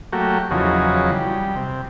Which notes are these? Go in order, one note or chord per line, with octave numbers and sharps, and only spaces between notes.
F#3 A3 A#3 F#4 G4
E2 C#3 F3 F#3 D#4 F#4
G3
C3